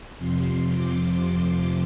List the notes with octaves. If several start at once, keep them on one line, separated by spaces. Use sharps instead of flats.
F2 C3 F3 C6
D6